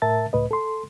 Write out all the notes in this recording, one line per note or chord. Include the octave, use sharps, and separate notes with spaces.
A2 A#4 E5 A5 A6
C#2 A2 B4 D#5
A4 C6